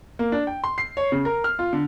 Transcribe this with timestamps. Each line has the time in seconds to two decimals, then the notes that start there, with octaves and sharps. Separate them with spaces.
0.19 A#3
0.32 D4
0.47 G5
0.64 C6
0.78 C7
0.97 C#5
1.12 C#3
1.25 A#4
1.44 F6
1.59 F4
1.73 D3